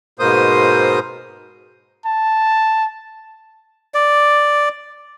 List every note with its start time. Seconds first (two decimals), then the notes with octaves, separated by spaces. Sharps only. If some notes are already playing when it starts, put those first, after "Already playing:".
0.19 G#2 B2 A#3 C5 D#6
2.06 A5
3.94 D5